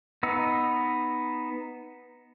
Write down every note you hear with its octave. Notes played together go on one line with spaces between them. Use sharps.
B3 D#4 E6